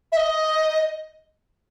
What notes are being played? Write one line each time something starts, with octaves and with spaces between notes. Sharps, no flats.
E5
D#5